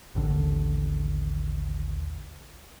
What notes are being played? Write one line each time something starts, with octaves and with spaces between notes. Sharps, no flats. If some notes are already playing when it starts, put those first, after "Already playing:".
A1 D#2 D3